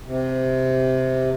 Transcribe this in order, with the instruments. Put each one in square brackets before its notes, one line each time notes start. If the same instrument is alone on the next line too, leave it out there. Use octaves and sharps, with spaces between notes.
[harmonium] C3